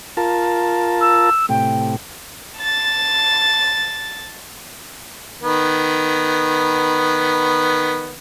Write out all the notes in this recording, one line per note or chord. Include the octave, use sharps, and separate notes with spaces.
F4 A#4 A5
E6
A2 C3 G5
A5 A6
D#3 B3